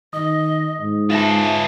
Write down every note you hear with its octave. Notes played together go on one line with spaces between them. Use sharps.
D#3 D#5 D#6
G#2
F4 B4 E5 A5 A#6 E7